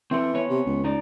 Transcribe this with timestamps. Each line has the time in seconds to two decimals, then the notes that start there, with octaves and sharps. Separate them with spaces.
0.11 E3 C4 A4
0.34 B3 C#5
0.49 C3
0.66 C#2
0.84 D#4 D5